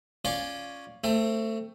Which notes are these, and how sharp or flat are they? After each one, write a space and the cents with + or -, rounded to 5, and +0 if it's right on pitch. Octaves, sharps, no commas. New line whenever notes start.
C#4 +0 F4 +0 D5 +0
A3 +20 C4 +0